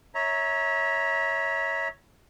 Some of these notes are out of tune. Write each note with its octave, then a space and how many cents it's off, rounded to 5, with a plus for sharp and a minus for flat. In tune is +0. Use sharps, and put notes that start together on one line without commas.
C#5 +0 E5 -25 A#5 +0